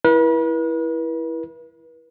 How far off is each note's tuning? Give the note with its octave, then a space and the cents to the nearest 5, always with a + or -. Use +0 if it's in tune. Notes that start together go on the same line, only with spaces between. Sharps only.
E4 +0 B4 -40